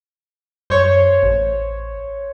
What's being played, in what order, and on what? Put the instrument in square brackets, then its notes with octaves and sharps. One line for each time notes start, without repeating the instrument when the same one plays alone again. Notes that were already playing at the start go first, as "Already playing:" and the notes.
[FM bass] F#2 [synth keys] C5 C#5
[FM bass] A1